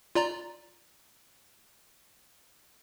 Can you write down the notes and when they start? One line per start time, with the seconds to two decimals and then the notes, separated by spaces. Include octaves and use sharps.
0.15 F4 D5 A#5